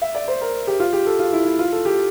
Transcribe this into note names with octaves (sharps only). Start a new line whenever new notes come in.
E5
D5
C5
A#4
G4
F4
G4
A4
F4
E4
E4
F4
A4
G4